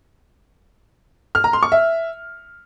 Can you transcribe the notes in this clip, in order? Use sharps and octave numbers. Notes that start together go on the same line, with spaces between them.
F6
A#5
C6
C#6
E5